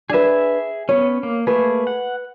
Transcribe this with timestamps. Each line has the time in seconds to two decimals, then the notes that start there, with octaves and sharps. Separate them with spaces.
0.10 D4 G#4 B4 E5
0.89 B3 C#4 C#5
1.23 A#3
1.47 A3 A#3 G#4 B4
1.87 F#5